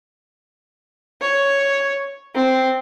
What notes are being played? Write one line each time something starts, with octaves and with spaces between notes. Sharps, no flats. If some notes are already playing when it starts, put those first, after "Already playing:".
C#5
C4